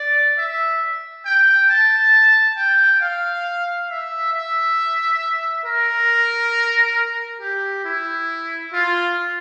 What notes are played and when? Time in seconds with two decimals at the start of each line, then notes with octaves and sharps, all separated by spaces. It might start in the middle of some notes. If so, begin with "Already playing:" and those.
Already playing: D5
0.37 E5
1.25 G5
1.69 A5
2.57 G5
3.01 F5
3.90 E5
4.33 E5
5.65 A#4
7.41 G4
7.85 E4
8.73 F4